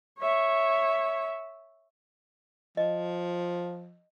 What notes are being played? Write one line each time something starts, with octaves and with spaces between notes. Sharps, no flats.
C#5 E5
F3 D#5